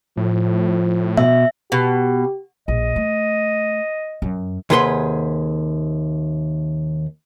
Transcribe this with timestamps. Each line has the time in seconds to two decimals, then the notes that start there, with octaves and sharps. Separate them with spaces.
0.17 A2 F3
1.17 B2 E5
1.72 B2 G4
2.68 A#1 D#5
2.96 A3
4.22 F#2
4.70 D#2 C3 G#4 B4 F#5 C6